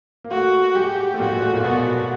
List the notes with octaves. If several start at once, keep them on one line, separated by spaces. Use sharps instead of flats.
A#3
A3 F#4
G#3 G4
A3
A#2 A#3 F#4
G#3
A3
A#2 A#3
B2 B3 F#4